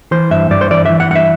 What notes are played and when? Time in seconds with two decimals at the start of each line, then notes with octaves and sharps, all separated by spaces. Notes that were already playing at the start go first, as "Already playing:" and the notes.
0.11 E3 C5
0.31 G2 E5
0.51 G2 D5
0.61 C5
0.70 E3 D5
0.86 E3 E5
1.00 F#5
1.10 G2 F#5
1.15 E5